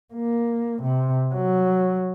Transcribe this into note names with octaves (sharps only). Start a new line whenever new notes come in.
A#3
C3
F#3